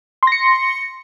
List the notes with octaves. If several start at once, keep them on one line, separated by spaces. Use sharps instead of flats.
C6 A#6 C#7